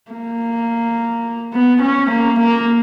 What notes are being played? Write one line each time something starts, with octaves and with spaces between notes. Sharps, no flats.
A#3
B3
C#4
A#3
A#3